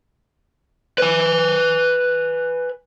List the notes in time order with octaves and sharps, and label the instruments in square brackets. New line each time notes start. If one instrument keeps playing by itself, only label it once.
[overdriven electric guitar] B4 G#5